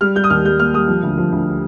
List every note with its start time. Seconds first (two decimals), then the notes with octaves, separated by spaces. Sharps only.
0.01 G3 F6
0.15 G3 G6
0.24 D#6
0.30 D#2 F6
0.45 G3 G6
0.59 A#3 F6
0.74 G3 D#6
0.88 F3
1.03 D2
1.18 F3
1.32 D2
1.47 D3